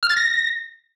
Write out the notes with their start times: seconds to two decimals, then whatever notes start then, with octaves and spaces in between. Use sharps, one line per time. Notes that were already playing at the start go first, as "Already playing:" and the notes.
0.03 F6
0.10 A6
0.16 A#6